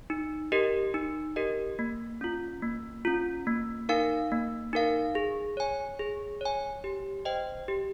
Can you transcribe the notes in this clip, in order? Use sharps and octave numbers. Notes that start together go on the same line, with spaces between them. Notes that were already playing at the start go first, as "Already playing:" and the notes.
D#4
G4 A#4 D#5
D#4
G4 A#4 D#5
A#3
C#4 F4
A#3
C#4 F4
A#3
D#4 A#4 F5
A#3
D#4 A#4 F5
G#4
C#5 G#5
G#4
C#5 G#5
G4
C5 D#5 G5
G4